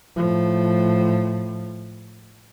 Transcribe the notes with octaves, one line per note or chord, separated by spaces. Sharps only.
A2 F3